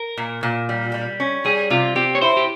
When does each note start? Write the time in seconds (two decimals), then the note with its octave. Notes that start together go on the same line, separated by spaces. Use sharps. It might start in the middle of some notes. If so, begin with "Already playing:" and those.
Already playing: A#4
0.18 A#2
0.43 A#2
0.69 G3
0.94 G3
1.20 C#4
1.45 G3 G#4
1.70 C3 F4
1.96 C4 G4
2.15 C#5
2.21 E4 C5
2.37 G4